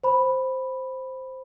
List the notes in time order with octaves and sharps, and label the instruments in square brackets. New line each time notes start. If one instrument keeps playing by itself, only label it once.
[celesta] C5 B5